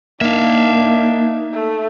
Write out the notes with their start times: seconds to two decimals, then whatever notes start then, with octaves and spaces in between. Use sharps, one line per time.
0.21 A#3 D4 D#4 E5 F5
1.53 A3